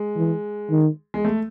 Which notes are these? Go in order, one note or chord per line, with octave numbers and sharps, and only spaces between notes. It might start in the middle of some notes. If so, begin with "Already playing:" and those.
Already playing: G#3
E3
D#3
G#3
A3